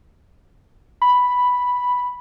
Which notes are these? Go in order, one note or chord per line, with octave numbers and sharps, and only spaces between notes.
B5